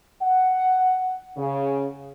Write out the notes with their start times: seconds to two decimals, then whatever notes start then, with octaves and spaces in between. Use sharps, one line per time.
0.22 F#5
1.37 C#3